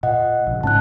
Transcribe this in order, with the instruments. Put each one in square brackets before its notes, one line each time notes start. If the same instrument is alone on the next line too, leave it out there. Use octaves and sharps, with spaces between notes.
[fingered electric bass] A#2 [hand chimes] D#5 F#5
[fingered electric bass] A#1 C#3
[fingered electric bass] G#2 C#4 [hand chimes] A5 F#6